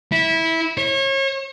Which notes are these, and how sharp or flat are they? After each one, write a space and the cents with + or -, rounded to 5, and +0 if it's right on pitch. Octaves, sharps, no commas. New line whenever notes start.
E4 -15
C#5 -35